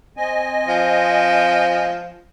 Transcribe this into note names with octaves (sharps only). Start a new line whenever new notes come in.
C4 D#5 G#5
F3